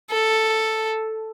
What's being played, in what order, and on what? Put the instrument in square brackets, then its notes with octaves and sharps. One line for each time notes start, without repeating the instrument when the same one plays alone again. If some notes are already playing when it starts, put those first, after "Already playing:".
[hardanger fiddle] A4